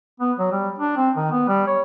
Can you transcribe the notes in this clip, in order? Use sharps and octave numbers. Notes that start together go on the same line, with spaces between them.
B3
F#3
G3
D4
C4
D#3
B3
G3
C#5